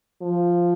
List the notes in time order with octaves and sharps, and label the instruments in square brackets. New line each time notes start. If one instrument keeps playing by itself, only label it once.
[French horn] F3